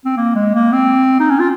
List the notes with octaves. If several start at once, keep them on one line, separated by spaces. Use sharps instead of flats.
C4
A#3
G#3
A#3
C4
D#4
C#4
F4